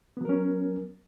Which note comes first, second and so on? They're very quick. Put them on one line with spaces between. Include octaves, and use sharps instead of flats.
B3 F#3 A#4 C#4